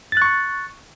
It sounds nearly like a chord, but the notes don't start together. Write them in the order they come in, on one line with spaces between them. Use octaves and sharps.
A6 F#6 C#6